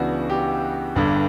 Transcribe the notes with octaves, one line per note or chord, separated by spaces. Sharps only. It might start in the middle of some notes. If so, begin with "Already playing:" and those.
Already playing: C#2 C#3 E3 B3 D4 F#4
G4
G1 G2 D3